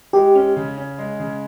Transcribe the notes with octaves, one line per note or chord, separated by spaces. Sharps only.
G#3 G4
C#4
C#3
C#4
G#3
C#3